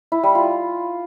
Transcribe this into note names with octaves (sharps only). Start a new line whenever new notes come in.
E4
G3
F4